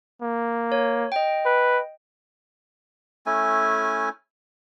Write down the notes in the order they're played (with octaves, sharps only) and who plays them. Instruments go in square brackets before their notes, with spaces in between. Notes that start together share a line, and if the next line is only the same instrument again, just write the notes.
[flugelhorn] A#3
[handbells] C#5
D#5 G5
[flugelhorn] B4
[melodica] A3 C#4 E4 G#5